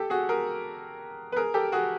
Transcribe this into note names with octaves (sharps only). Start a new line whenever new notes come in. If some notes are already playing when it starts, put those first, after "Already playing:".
Already playing: G4 A4
F#4 G#4
G#4 A#4
B4
G#4 A#4
G4 A4
F#4 G#4